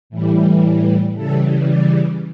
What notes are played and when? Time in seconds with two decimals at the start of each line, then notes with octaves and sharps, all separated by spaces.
0.10 A2 E3 G3
1.15 C#3 E3 G3 A4
1.67 D5